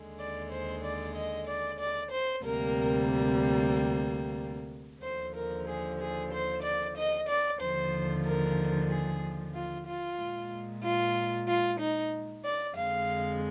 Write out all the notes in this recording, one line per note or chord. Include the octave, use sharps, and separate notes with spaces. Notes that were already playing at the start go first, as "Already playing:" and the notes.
Already playing: D#2 D3 G#3
D5
C5
D5
D#5
D5
D5
C5
D2 C3 G3 A#3 A#4
D#2 D3 F3 C5
A#4
G#4
G#4
C5
D5
D#5
D5
D#2 D3 F3 C5
A#4
G#4
F4
F4
A#2 G#3
F4
F4
D#4
D5
F2 D3 F3 G#3 F5